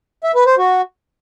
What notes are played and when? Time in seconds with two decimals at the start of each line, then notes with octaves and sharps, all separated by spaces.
0.24 E5
0.35 B4
0.46 C5
0.58 F#4